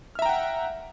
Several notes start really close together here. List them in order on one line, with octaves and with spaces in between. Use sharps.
F6 E5 A#5 G5 F#5